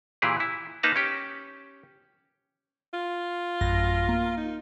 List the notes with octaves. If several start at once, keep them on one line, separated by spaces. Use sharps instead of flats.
A#2 E3 E4 G4 G#4
E4
A#3 D#4 B4 A5 A#5
C#4 G4
F4
A1 F#2 A#6
A#3
D#4